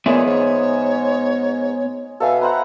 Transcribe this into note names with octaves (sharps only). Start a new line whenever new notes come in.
A#2 G#3 B3 C#5 E5
G#2 C#5
B2 A4 E5 F5 G#5
B4 C5 F#5 A#5